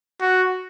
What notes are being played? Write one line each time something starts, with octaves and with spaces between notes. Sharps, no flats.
F#4